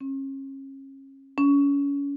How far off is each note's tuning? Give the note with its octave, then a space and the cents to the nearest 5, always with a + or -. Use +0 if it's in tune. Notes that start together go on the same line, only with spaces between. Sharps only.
C#4 -35
C#4 +30